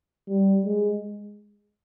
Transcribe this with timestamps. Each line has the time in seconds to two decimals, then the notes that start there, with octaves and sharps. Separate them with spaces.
0.29 G3
0.65 G#3